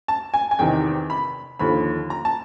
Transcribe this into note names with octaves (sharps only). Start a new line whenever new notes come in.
A5
G#5
G#5
E2 C3 D#3 G5
B5
D#2 D3 F3 B5
A#5
A5